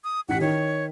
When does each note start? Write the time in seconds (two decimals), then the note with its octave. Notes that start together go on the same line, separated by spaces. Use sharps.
0.04 D#6
0.29 A1 G4 F#5 B6
0.41 D#3 C#5